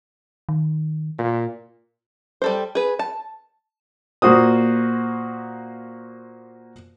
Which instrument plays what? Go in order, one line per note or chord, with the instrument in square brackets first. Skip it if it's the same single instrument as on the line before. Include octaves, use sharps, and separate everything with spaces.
[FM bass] D#3
[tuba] A#2
[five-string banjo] G3 A4 C5
G#4 B4
A5
[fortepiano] A#2 A#3 F#4 C5 D#6